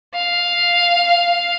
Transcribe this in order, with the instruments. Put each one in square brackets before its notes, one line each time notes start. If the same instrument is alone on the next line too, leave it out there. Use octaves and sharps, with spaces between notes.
[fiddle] F5